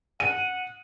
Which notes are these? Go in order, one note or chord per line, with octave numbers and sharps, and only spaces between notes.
F#5 D#7